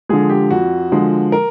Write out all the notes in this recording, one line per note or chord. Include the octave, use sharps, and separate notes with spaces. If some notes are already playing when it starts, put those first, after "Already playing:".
D3 F3 G#3 G#4
G4
F2 F#4
D3 F3 G#3
A#4